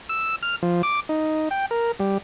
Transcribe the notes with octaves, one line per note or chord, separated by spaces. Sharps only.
E6
F6
F3
D6
D#4
G5
A#4
G3